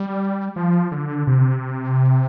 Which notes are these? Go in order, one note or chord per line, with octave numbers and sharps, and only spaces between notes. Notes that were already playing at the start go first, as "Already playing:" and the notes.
Already playing: G3
F3
D3
C3